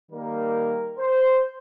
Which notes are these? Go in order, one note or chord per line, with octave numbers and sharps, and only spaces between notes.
D#3 G3 A#3 A#4
C5